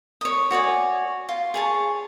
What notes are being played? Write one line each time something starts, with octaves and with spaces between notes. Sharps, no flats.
C#5 D#6
F#4 C#5 D5 G#5
F4
G#4 C#5 A5